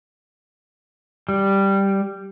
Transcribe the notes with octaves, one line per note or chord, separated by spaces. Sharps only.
G3